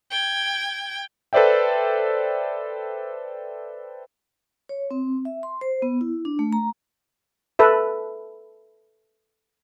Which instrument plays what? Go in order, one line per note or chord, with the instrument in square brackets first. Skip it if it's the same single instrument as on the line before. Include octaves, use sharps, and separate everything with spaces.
[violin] G5 G#6
[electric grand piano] A4 B4 C5 D5 E5 G5
[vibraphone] C#5
C4
E5
C6
C5
B3
E4
D4
A3
A#5
[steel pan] A4 B4 E5